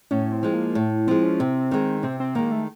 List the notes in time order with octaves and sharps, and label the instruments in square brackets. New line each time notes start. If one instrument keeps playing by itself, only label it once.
[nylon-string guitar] A2 [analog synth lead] C#4
[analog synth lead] C4
[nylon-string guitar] F3 G#3
[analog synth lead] A#3
[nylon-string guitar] A2 [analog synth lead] A3
[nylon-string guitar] F3 G#3 [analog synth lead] C4
[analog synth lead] C#4
[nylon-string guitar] C3 [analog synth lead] C4
[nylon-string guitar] D#3 G#3
[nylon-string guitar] C3 [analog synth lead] C4
[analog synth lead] C4
[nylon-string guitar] D#3 G#3 [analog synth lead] A#3
[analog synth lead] A3